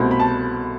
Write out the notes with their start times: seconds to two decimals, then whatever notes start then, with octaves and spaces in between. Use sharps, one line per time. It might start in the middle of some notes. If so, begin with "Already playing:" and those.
Already playing: C2 B2 A3 C4 B5
0.11 B5
0.20 A5